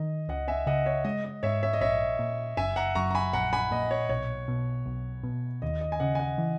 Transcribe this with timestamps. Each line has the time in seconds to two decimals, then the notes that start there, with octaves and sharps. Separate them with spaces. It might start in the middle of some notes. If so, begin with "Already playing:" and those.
Already playing: D#3 D#5
0.28 C#2 D#5 F#5
0.48 E5 G#5
0.66 C#3 D#5 F#5
0.86 C#5 E5
1.05 G#3 D#5
1.24 D#5
1.43 G#2 C#5 E5
1.63 C#5 E5
1.73 D#5
1.81 A#1 C#5 E5
2.19 A#2
2.57 F#1 E5 G#5
2.76 F#5 A#5
2.95 F#2 A#5 C#6
3.11 A#5
3.15 G#5 B5
3.33 A#1 F#5 A#5
3.53 G#5 B5
3.71 A#2 D#5
3.91 C#5
4.09 B1 C#5
4.48 B2
4.86 B1
5.23 B2
5.62 D#2 D#5
5.81 D#5
5.92 G#5
6.00 C#3 D#5 F#5
6.15 G#5
6.19 D#5 F#5
6.38 E3